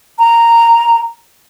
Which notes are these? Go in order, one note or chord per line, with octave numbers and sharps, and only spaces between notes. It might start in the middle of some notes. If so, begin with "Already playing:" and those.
A#5